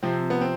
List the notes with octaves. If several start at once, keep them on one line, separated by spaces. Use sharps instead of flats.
C3 F3 C4
B3
C4